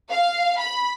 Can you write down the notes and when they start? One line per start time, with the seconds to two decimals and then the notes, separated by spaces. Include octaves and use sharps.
0.10 F5
0.59 B5